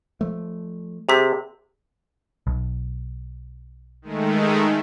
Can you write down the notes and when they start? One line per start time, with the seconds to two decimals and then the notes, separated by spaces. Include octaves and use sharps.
0.21 F3 A3
1.09 C3 G4 G#4 B6
2.47 B1
4.02 D#3 G#3 A3